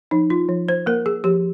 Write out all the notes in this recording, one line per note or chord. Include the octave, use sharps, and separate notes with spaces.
F3 D#4
F4
F3
C5
A#3 A#4
G#4
F3 G4